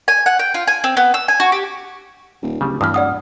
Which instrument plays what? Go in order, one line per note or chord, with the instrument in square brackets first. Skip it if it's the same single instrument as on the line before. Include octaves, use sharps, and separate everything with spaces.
[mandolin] G#5
F#5
G5
F4
G#5
C4
B3
E6
G#5
F#4
G4
[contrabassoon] D#1
[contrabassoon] D1 [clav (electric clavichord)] C#3 G3
[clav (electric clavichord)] G2 E3 [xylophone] D#6 F6
[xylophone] D5 F#5 D#6